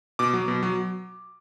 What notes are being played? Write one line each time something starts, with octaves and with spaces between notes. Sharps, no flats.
B2 D6
F#3
B2
F#3